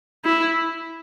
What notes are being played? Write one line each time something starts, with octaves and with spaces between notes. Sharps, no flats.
E4